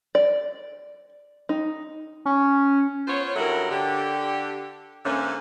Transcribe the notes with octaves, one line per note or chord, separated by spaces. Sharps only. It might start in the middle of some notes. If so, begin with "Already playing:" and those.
D5
D#4
C#4
B3 F4 C5 C#5
G2 F#3 E4 F#4 A4 A#4
D3 G4
G#2 D3 A3 A#3 C#4